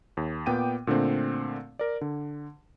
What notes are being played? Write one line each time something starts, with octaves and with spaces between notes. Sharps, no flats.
D#2
A#2 B3 G5 D6 D#7
A#2 D3 A3 C4
A#4 D5
D3